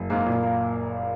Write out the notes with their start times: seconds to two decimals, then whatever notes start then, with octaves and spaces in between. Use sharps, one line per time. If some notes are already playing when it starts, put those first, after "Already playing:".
Already playing: F#1
0.10 G#2 A#3
0.26 A#2
0.43 A#3